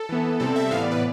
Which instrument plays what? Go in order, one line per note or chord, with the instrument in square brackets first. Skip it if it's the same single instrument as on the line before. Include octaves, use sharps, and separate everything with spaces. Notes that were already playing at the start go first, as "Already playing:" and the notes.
Already playing: [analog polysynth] A4
E3 B3
C3 G3 C4 A4
E5
A2 E3 B3 F5
D5
B4